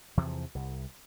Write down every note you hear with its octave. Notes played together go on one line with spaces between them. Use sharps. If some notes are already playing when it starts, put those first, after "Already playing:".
E2 C3 E3 F3
C2